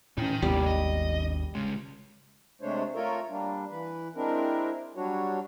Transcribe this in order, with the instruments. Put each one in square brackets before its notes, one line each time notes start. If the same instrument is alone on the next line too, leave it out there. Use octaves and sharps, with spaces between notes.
[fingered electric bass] A2 C#4 [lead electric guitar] D#4 G5
[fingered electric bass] G#1 D#2 B3 [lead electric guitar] C3 A#3 [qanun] G3
[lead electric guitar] D#5
C#3 G#3
[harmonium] C3 G#3 A3 D4 C5 C#5
A3 F4 A4 A#4 C#5
G3 A#3 D4
E3 B4
G#3 C4 D4 E4 A#4
F#3 G3 D4 F#4 C#5